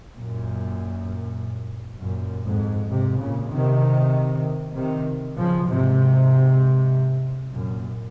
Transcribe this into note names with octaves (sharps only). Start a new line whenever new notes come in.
F#2 A#2
F#2 A#2
F2 G#2
G#2 C3
A#2 C#3
C3 D#3
C3 D#3
C#3 F3
G#2 C3
F#2 A#2